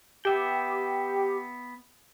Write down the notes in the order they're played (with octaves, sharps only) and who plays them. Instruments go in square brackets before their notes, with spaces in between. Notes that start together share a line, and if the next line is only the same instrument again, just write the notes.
[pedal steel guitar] B3 E5 G5 [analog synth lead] G4